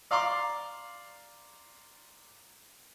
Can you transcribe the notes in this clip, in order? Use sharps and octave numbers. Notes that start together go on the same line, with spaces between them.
D5 F5 A#5 C6 D6